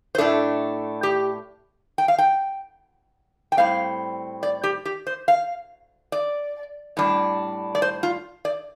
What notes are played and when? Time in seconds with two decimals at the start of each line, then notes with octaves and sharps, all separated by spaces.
0.15 C5
0.18 A2 A3 D4 A4
1.03 G4
1.98 G5
2.08 F5
2.18 G5
3.52 G5
3.57 A2 G3 C4 F5
4.43 D5
4.64 G4
4.85 G4
5.07 C5
5.28 F5
6.12 D5
6.97 A2 G3 D4
7.75 D5
7.82 C5
8.03 F4
8.45 D5